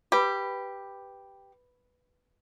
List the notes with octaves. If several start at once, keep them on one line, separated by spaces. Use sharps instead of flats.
G4 B4 B5